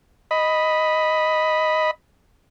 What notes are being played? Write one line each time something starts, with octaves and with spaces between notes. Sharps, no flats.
D#5 B5